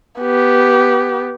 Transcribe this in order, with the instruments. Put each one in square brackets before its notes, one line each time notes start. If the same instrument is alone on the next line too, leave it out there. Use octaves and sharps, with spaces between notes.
[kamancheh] B3 G4